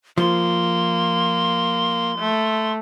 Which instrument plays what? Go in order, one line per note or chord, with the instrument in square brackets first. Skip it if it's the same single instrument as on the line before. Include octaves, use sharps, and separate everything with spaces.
[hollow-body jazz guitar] F3 [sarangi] A#3 [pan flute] C6
[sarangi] A3